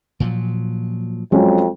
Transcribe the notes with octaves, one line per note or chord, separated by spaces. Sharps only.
A#2 F3 F#3
F2 F#3 G#3 C#4